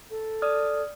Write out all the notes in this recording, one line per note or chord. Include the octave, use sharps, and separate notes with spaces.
A4
D5 D#6 F6